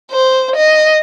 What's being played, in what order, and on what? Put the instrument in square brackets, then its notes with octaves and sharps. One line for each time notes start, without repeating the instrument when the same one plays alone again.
[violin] C5
D#5